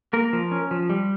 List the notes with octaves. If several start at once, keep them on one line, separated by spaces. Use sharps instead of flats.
A#3 A#4
F3
C#4
F3
G3